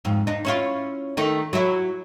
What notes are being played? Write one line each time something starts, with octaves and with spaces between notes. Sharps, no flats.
F2 G#2
D4 D#4
C#4 E4 F4
D#3 A3 D#4
F#3 E4